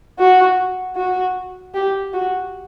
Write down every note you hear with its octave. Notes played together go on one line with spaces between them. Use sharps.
F#4
F#4
G4
F#4